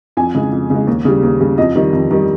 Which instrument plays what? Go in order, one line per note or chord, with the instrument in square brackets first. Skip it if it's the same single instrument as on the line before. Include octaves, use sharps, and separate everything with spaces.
[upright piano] F2 G#5
C#3 G#3
F2
C#3 G#3
D#2
C#3 G3
D#2
C#3 G3
F2 D#5
D#3 G3
F2
D#3 G3